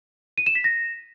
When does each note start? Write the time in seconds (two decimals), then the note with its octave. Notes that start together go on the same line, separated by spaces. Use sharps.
0.38 D#7
0.46 E7
0.55 B6
0.64 A#6